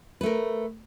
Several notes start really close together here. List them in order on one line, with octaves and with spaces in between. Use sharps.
B4 A3 A#4